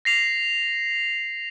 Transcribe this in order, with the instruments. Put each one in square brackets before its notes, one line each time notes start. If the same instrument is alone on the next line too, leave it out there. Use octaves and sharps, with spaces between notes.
[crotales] A#6 C7 F7